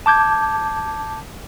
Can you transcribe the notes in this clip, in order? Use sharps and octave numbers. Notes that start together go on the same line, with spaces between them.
A5 D6 G6 G#6